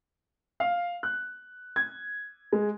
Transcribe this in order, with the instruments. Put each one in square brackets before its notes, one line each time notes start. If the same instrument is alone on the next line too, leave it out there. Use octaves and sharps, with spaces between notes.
[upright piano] F5
F#6
G#6
G#3